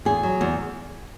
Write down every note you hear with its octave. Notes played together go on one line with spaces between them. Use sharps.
E2 G#4
F#3
E2